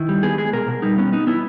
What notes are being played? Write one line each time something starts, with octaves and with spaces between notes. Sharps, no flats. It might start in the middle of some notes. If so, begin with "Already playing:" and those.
Already playing: D#3 E4
G3
B3 G#4
G#3 G#4
B2 A#4
B2
G3 D#4
B3 C#4
B3 D#4
B3 E4